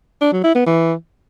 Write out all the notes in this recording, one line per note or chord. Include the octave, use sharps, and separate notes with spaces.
D4
F#3
E4
B3
E3